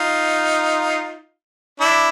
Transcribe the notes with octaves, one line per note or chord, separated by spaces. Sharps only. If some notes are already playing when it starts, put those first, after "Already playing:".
Already playing: D#4 F4
D4 E4